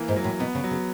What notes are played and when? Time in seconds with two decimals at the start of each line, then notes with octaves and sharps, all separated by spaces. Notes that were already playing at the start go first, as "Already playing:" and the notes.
Already playing: E3 A#3
0.08 G#2
0.16 F#3
0.24 A2
0.40 B2 B3
0.55 C#3
0.64 F#3
0.71 C#3